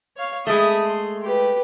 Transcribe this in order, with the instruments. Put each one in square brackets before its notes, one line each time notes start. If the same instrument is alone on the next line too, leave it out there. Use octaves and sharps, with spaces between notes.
[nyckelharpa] C#5 F5
[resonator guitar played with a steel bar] G#3 A3 [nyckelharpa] B5 D#6
[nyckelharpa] C6
G4 B4